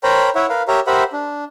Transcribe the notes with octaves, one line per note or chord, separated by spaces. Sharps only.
A#4 C5 C#5 G5 A#5 B5
E4 C#5 E5 F#5
A#4 B4 F5
G4 A#4 C#5 E5 A#5
G4 A#4 C5 E5 F#5 B5
D4